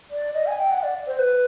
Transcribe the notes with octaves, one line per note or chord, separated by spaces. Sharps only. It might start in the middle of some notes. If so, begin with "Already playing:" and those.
D5
D#5
G#5
G5
F#5
D5
C5
B4